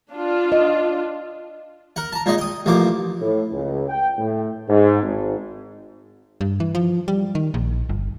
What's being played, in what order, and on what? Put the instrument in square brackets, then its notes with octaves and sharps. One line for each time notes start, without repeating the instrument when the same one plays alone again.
[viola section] D4 F4
[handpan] D#5
[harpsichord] A#4 F#5
A5 A#5
A#2 G#3 D#4 D#5
G5 D#6
A1 F3 A#3 D6
[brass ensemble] A2
C#2
G5
A2
G#2
G#1
[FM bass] G2
E3
F3
G3
D#3
A#1
G1